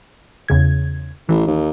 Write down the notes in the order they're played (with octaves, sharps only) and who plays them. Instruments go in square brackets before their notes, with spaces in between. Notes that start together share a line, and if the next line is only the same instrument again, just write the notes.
[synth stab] E2 C#3 G#6
[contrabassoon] A1 [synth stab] E3
[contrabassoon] D#2